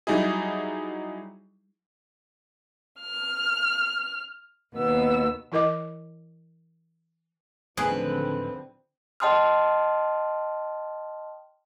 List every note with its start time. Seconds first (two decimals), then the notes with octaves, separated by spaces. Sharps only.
0.07 F#3 G3 D#4 E4 G#4
2.99 F6
4.75 D#2 B2 B3 E6
5.52 E3 E4 A#4 D#5 D6
7.77 D1 D3 D#3 F3 C4 G#4 B4
9.20 D#5 G5 A5 C6 D#6 F6